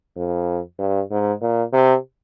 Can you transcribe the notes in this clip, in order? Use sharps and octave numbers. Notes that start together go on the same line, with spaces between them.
F2
G2
G#2
A#2
C3